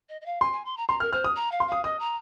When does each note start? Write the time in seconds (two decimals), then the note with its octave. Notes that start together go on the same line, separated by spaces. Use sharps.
0.09 D#5
0.21 D#5
0.26 F5
0.41 G#5 C6
0.53 G#5
0.65 C6
0.77 A#5
0.89 A#5 C6
1.00 A#4 F6
1.12 C5 F6
1.24 D#6
1.36 A#5
1.52 F5
1.60 C6
1.68 F5 D#6
1.84 D#5 D#6
1.99 A#5